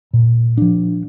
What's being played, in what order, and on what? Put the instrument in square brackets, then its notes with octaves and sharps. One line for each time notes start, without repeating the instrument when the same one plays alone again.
[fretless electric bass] A#2
F3 D4